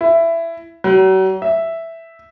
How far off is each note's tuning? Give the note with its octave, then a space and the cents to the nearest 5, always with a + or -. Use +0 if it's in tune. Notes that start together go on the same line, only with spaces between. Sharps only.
E4 +15
F#3 +40
E5 +0